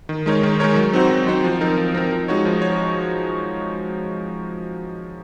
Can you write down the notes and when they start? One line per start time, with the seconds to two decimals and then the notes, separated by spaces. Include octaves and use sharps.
0.09 D#3
0.26 G#3 D#4 A#4 C#5
0.43 D#3
0.60 G#3 D#4 A#4 C#5
0.76 F#3
0.93 C4 D#4 F#4 C5
1.11 F#3
1.27 C4 D#4 F#4 C5
1.44 F3
1.61 C4 D#4 A#4
1.78 F3
1.94 C4 D#4 A#4
2.11 F3
2.28 G#3 D#4 F#4 C#5
2.45 F3
2.62 C#5